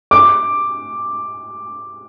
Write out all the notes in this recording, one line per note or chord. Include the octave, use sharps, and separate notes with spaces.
D6